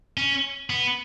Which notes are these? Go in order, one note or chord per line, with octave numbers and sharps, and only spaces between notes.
C#4
B3